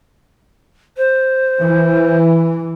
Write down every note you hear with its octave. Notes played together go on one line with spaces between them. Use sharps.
C5
E3